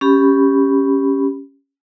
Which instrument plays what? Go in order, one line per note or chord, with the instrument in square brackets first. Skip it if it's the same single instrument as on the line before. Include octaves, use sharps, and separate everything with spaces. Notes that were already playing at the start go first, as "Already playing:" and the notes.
[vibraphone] C#4 G4 B5